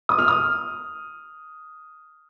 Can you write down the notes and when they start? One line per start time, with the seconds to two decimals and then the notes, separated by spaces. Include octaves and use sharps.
0.09 D#6
0.19 F6
0.28 D#6